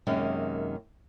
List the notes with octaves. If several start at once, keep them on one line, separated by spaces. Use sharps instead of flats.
F#2 C3 D#3 G#3 A#3 C#4